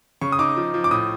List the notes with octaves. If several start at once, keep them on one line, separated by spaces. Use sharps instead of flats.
C#3 C#6
D#6
D#4 D6
F3
F3
D6
A2 D#6